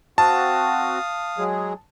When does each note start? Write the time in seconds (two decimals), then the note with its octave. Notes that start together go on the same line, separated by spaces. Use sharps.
0.18 C4 F#4 F5 A5 D#6
1.38 F#3 G#3 G#4